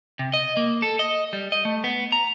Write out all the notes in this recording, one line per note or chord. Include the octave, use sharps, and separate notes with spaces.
C3
D#5
A#3
A4
D#5
G3
D#5
A3
B3
A#5